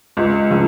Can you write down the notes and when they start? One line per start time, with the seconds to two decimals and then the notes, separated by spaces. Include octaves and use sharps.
0.17 C#2
0.50 C#3 F3